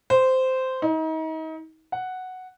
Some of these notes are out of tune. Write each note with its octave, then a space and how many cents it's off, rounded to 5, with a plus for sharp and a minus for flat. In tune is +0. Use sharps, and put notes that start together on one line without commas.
C5 -10
D#4 +35
F#5 +0